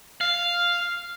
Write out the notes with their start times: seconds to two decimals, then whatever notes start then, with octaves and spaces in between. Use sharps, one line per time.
0.21 F5